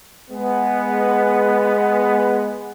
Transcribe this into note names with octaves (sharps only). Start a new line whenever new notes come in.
G#3 B3